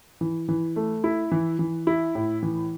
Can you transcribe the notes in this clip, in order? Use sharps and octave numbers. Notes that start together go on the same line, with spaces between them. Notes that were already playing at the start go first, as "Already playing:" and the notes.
E3
E3
A3
E4
E3
E3
E4
A2
E3